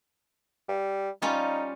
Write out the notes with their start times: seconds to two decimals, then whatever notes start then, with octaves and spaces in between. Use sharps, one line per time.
0.68 G3
1.22 G3 C#4 D#4 F4